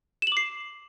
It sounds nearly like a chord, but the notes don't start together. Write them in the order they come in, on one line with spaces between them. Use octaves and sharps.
E7 F#7 D6 C7